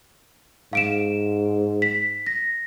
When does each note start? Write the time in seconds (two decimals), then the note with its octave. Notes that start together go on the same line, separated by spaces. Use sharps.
0.73 G#2 F5 D7 E7
1.82 B6
2.27 A#6